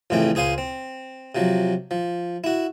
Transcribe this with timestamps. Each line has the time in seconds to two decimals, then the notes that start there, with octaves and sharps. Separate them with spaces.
0.10 A1 F2 C#3 E3 A3 G5
0.35 C#2 G#4 C5 F5 G#5 C6
0.58 C4
1.35 C3 F3 F#3
1.91 F3
2.44 E4 F#4